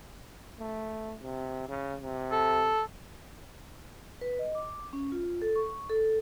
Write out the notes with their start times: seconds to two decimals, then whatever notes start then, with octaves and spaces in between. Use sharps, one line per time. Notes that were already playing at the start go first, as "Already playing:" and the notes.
0.59 A3
1.22 C3
1.69 C#3
2.01 C3
2.32 A4
4.21 B4
4.39 D#5
4.55 D6
4.93 C#4
5.12 F4
5.42 A4
5.56 C#6
5.90 A4